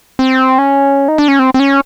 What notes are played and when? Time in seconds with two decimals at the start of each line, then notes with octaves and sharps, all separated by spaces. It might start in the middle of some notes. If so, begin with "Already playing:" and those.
0.19 C4
0.58 C#4
1.08 D#4
1.18 D4
1.28 C#4
1.39 C4
1.54 C4
1.60 C#4